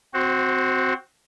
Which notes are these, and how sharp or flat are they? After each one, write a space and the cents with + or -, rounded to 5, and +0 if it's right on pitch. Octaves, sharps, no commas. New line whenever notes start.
C4 -15 F#4 +0 C5 +20